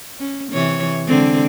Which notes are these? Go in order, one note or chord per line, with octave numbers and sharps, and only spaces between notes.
C#4
C3 E3 C#5
D3 G#3 C4